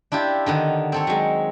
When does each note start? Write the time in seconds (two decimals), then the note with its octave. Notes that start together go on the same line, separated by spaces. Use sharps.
0.12 D4 E4 F4 G4
0.46 D3 D#3 B3
0.92 C4 A4 C#5
1.07 F#3 G#3